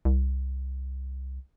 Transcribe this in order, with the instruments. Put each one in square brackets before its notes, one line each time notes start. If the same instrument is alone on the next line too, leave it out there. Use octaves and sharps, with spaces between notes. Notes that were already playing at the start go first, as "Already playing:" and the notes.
[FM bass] C2